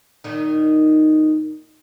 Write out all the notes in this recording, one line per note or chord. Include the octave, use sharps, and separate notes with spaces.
A#2 D#3 D#4